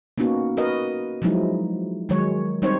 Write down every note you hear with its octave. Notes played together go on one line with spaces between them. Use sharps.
A#3 B3 C#4 D#4 F#4
F#4 A#4 B4 D#5
F3 F#3 G#3 D#4 E4
D#3 F#3 G#3 C#5
G3 C4 D#4 C5 C#5